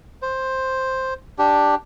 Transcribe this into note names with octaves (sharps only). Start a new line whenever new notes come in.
C5
D4 G4